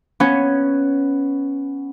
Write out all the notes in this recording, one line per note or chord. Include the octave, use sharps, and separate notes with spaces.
B3 C#4 C#5